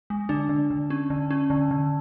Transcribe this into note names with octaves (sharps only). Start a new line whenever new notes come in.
G#3
D3 D4
D3
D3
C#4
D3
C#4
D3
D3